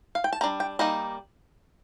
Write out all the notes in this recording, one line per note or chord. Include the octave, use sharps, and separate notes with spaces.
F5
G5
A5
G3 D4 A#5
G5
G3 A#3 D#4 D#5